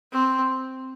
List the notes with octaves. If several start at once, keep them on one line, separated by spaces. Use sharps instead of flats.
C4